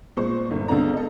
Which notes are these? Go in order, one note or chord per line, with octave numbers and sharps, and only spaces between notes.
A#2 G#3 C5 C#6
G1
C#2 D3 B3 D4 A#5
A4 D#5